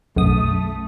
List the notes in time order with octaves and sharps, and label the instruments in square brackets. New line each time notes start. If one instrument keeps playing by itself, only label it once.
[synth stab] B1 F#2 D#6 [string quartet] A3